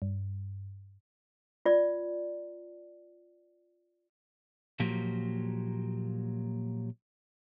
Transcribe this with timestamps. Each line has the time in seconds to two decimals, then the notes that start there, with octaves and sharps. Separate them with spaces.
0.02 G2
1.66 F4 D5
4.80 A#2 F3 F#3 A#3 G4